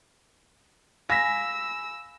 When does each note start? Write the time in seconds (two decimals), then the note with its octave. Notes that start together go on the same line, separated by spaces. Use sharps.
1.10 F5 G#5 B5 E6 A#6 B6